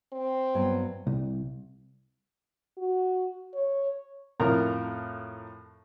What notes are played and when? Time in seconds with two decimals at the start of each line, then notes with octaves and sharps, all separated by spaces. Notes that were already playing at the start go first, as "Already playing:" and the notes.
0.12 C4
0.55 G2 F#3 B3
1.07 C2
2.78 F#4
3.55 C#5
4.40 F2 A2 A#4 A#5